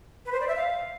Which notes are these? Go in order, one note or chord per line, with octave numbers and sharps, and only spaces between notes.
B4
C5
D5
E5
F5